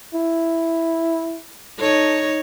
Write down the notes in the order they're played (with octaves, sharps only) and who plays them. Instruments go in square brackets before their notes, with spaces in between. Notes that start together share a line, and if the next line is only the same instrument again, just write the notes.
[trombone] E4
[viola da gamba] D#4 C#5 [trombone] A4